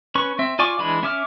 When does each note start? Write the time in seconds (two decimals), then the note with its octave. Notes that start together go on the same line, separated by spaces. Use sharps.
0.15 C#4 B4 C#6
0.39 C4 E5
0.59 F4 D5 G#5 C#6 D6
0.79 E3 G#3 D4 B5
1.03 C#4 E5 D6 F6